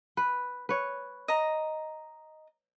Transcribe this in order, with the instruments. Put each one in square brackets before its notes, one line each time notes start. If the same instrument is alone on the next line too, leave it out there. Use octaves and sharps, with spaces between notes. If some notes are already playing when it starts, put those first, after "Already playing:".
[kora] B4
B4 C#5
[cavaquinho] D#5 A#5